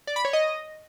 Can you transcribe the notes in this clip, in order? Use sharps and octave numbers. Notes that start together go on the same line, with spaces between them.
D5
B5
C#5
D#5